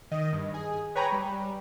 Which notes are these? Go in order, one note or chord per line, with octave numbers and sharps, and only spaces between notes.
D#3 D#5
G2
G#4
B4 C#5 G5 G#5 A#5 B5
G3